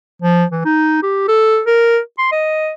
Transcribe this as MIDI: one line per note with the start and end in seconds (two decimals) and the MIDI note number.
0.22 0.44 53
0.52 0.64 52
0.65 1.00 63
1.03 1.25 67
1.28 1.61 69
1.66 1.99 70
2.18 2.30 84
2.32 2.72 75